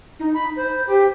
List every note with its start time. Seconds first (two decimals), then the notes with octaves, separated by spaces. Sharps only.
0.20 D#4
0.34 B5
0.56 C5
0.87 G4